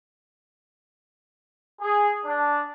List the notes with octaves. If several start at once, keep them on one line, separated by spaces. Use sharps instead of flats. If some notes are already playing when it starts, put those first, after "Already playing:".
G#4
D4